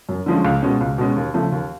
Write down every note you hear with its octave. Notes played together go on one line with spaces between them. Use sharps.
F#2
D3 F3 G#3 C#4
C#2
B2 G#3 C#4
C#2
B2 G#3 C#4
D#2
C#3 F3 A3
D#2